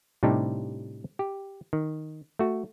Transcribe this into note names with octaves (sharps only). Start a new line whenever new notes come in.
A2 C3 G3 D4 D#4 G4
G4
D#3
A3 F#4